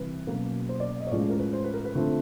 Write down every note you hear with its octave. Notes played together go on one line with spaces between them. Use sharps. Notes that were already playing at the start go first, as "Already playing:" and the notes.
Already playing: C3 E3 G3 B4
B2 F#3 A#3 C#4
C5
D5
D#5
C#5
A2 F3 G#3 C#4 D5
A#4
B4
C5
B4
A#4
B4
D3 F3 A3 C4